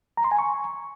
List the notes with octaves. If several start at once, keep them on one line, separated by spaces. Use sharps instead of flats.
A#5
C6
G#5
C#6